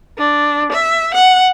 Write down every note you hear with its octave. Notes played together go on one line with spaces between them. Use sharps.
D4
E5
F#5